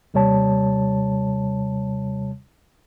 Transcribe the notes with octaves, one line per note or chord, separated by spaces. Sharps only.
D#2 C3 G3 C#5 A5